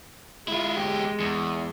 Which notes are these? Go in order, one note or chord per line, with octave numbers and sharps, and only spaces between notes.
G#3 E4 F4
E2 G4
E2